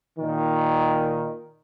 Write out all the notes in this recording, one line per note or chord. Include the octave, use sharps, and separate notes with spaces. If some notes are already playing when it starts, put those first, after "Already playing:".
A#2 D#3